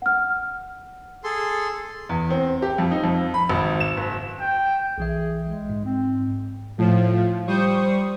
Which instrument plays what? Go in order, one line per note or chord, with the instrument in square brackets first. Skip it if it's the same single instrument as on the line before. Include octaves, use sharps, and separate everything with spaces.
[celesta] F#5 F6
[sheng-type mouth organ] G#4 A4 C6
[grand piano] E2
C4
G4
F2
D#4
F2
B5
G#1
E7
F#1
[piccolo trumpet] G5
[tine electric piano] B1 E3 E5 [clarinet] G#4
[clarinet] G#3
[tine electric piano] G#2
[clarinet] C4
[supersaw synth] A2 [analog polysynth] F3
[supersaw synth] G3 C#6 D#6 [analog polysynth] C5